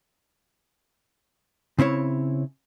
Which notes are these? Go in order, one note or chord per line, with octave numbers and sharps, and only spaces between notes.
C#3 C4 E4 C#5